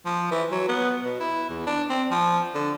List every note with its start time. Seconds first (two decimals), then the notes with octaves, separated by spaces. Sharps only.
0.05 F3
0.31 E3
0.51 F#3
0.68 B3
1.04 B2
1.20 E4
1.49 E2
1.67 D4
1.89 C4
2.11 F3
2.54 D3